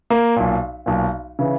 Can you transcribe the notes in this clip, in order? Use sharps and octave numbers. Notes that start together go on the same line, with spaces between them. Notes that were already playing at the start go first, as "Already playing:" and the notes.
A#3
B1 A#2
B1 A#2
C#3 E3